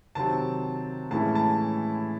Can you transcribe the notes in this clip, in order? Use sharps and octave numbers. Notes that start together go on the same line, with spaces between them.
C3 D#3 F#3 C4 A5
A2 E3 G#3 C#4 E4 A5
A5